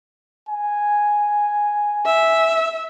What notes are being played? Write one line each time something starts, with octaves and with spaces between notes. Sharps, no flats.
G#5
E5